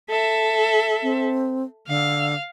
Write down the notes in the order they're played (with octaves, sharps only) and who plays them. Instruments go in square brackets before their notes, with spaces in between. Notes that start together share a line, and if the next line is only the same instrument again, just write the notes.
[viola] A4 E5
[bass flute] C4
[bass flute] D3 [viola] F5